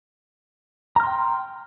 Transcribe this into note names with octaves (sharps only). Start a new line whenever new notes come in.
G5 A#5 C6 F6